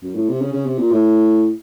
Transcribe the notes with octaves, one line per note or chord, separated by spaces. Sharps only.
F#2
A2
C3
C#3
C#3
C3
A#2
A2